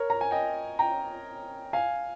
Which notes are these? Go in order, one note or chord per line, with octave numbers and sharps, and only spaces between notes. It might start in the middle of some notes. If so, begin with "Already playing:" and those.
Already playing: A#4 C#5
A#5
G#5
D#5 G5
G5 A#5
F5 G#5